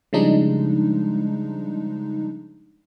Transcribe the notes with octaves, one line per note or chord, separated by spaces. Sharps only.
C#3 F3 G3 G#3 D4 D#4